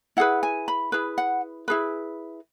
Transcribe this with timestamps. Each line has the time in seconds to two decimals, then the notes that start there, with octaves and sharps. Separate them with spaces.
0.17 E4 G#4 B4 F#5
0.43 G#5
0.68 B5
0.92 E4 G#4 B4
1.18 F#5
1.68 E4 G#4 B4